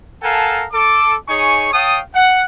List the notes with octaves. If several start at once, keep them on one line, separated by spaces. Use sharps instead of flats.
A4 A#4 F5 F#5 G#5 A5
A4 D6
D#4 G#4 C#5 G#5 C#6
C#5 F5 G5 A5 D#6
F#5